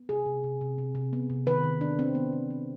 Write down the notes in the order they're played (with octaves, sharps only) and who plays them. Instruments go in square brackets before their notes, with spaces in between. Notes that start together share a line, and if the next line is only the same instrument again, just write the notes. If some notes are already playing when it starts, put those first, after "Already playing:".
Already playing: [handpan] B3
C3 G#4
C3
C3
C3
C3
C3
B3
C3
D#3 B4
D#3
B3 D4
D#3 C4
D#3 B3
D#3
B3